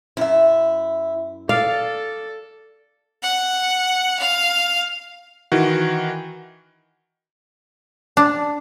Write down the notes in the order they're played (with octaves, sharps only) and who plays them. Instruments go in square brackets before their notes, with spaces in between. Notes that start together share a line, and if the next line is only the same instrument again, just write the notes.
[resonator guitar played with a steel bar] F#2 E5 [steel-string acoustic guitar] E4
[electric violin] A4 [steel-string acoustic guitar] D5 [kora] F5
[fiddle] F#5
F5
[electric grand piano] D#3 E3 F#4
[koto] D4